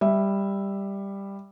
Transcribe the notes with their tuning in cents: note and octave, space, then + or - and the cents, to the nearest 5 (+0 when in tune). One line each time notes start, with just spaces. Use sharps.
G3 +10 E5 +0